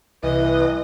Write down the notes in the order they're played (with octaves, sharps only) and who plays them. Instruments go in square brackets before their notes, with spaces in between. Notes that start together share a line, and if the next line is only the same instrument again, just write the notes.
[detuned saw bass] C2 [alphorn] E3 [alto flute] B4 [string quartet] D#5